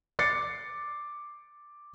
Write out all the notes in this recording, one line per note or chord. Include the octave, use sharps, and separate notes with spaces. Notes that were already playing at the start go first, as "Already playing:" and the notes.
D6 A6 C7 C#7